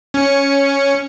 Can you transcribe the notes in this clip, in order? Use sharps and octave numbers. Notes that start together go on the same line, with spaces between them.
C#4 C#7